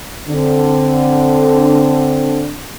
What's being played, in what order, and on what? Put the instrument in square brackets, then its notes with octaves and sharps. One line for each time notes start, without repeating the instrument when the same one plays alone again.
[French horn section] D3 [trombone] C4